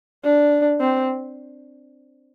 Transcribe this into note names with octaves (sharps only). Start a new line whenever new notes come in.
D4
C4